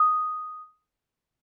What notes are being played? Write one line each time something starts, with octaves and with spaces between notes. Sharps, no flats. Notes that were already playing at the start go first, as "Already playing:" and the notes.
Already playing: D#6